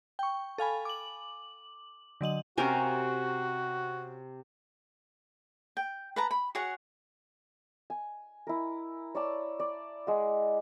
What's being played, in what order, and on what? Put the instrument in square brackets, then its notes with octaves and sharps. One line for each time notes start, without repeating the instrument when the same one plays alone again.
[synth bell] G5 C#6
A4 F5 G#5 B5
D6 F#7
D3 F#3 D#5 F#7
[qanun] C3 A#4 G5 [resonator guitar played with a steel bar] C#4 G4 G#5 [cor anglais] F#4
[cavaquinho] G5
B4 A5 A#5
B5
F#4 G#4 C#5 F#5
[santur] G#5
E4 A#4
C#5 D5 A5
D5
G#3 F#5